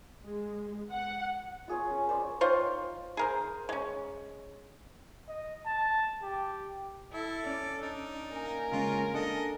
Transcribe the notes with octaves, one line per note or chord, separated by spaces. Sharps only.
G#3
F#5
F4 G#4 C#5
C#4
B4 C5 D5
D#3 F4 C5 C#5
G#4 A#4 C5
G#3 C#4
D#5
A5
G4
E4 A4
C#4 D5
D4 D#4
A#3 A#4 G#5
C#3 G#3 C#4 F4
D4 A4 D#5